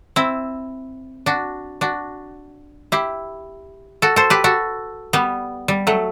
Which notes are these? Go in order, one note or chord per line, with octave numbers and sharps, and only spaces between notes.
C4 E4
D4 F#4
D4 F#4
E4 G4
F#4 A4
A4 C5
G4 B4
F#4 A4
G3 B3
G3
F#3 A3